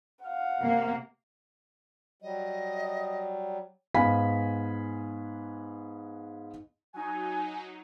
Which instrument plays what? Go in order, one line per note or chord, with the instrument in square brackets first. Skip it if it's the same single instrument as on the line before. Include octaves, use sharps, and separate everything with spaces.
[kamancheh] F5 F#5
[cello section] C3 A#3
[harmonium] F#3 G3 [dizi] D#5
[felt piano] G#2 B3 F5 G#5 B5 B6
[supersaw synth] F#3 D#4 [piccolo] G#5